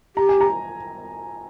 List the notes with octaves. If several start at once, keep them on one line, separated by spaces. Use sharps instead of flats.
G4 A#5
G#5
A#5